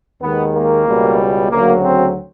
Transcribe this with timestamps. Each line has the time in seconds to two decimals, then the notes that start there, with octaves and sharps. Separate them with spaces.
0.21 D#2 D#3 G#3 B3
0.53 A#3
0.86 C#2 B2 G3
1.50 D2 C#3 F#3 A#3
1.83 C4